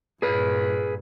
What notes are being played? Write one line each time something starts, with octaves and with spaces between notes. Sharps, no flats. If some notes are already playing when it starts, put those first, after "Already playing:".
G2 A#2 G#4 B4